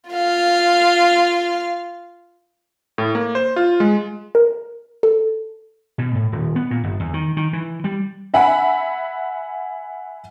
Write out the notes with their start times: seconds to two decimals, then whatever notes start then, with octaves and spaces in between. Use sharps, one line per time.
0.10 F4 F5
2.98 A2
3.15 A#3
3.35 C5
3.56 F4
3.80 G#3
4.35 A#4
5.03 A4
5.98 B2
6.15 A2
6.32 D#1
6.56 B3
6.71 A#2
6.84 G1
7.00 E2
7.14 D#3
7.37 D#3
7.53 E3
7.84 G3
8.34 E5 F#5 G#5 B5